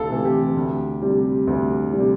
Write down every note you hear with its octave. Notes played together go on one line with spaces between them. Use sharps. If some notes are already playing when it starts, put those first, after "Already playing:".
Already playing: D2 C3 A4 F5
C3 E3 A3
G4
D2
C3 G3
D2
G3
C3